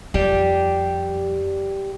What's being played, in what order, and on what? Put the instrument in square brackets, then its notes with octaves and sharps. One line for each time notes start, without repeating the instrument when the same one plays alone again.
[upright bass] F2 [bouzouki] G3 D4 G4